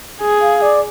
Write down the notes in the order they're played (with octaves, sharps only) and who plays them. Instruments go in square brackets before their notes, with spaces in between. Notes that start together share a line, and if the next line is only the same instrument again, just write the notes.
[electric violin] G#4
[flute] F5
D5